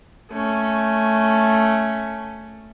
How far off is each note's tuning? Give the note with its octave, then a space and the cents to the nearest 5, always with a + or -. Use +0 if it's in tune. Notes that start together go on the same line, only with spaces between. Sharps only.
A3 +0 C#4 +0